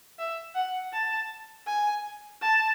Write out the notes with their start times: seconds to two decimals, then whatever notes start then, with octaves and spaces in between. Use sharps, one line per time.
0.19 E5
0.55 F#5
0.93 A5
1.67 G#5
2.41 A5